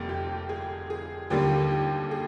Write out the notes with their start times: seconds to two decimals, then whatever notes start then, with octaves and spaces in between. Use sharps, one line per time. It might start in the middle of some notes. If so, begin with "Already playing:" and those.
Already playing: F1 F2 C3 G3 A#3
0.09 G4
0.49 G#4
0.90 G#4
1.30 D#2 D3 G3 A#3 G4
1.71 G4
2.11 G#4